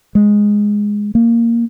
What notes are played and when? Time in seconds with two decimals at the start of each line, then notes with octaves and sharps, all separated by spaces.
0.15 G#3
1.15 A#3